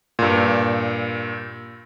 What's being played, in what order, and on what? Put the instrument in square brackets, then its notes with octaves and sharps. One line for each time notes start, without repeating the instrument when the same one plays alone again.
[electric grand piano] G2 A#2